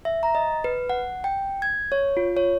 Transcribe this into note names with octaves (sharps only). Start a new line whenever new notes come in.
E5
A#5
D#5
B4
F#5
G5
G#6
C#5
F4
C#5